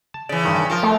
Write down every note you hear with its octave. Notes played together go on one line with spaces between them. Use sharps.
A5
C#3 E3 D5
G2 D#3
F3 F4 A#4 A5
A3